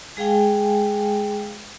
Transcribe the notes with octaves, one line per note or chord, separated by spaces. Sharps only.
G#3 G#4 F5 G5 G#5